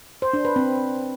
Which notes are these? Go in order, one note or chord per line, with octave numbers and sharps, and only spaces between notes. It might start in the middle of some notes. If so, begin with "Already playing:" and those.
C5
D4
B4
C4